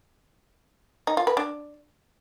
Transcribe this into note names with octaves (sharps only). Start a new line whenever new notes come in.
D#4
F4
B4
D4